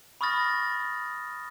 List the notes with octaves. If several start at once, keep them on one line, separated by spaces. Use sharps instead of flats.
B5 C#6 D#6 F6 A6 A#6